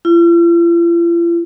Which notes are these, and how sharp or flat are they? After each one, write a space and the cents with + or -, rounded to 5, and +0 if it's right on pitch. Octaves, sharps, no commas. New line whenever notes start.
F4 -45